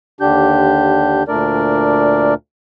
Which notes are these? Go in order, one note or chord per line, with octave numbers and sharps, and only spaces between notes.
D#2 D3 D4 G4 G6
D2 A#2 A3 D4 A#4 D5